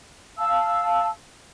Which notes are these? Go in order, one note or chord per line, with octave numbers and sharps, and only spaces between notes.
F5 A5 E6